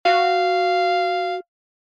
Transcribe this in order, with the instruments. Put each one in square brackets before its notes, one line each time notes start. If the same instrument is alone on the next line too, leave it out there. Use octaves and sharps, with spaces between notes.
[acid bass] F#4 [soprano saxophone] F5